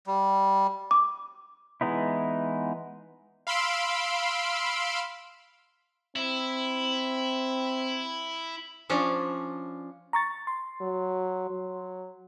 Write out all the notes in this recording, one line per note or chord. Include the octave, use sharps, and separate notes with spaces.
G3
D6
E3 G#3 B3 D#4 E4
F5 B5 C6 E6 D7
C4 E4
F3 C#4 D4
A#5 C#6 A6
C6
F#3
F#3